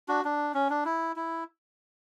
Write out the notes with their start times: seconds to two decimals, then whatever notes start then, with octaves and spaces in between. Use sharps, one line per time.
0.09 D4 F#4
0.25 D4
0.54 C#4
0.70 D4
0.85 E4
1.16 E4